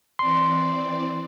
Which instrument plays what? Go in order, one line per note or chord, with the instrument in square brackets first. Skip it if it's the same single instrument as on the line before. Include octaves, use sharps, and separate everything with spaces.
[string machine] E3 C4 D5 [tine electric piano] C6